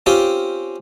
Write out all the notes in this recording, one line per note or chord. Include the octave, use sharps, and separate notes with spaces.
C4 C#4 F4 G4